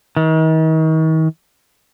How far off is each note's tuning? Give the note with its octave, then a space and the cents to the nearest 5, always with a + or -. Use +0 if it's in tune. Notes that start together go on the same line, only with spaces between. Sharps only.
D#3 +40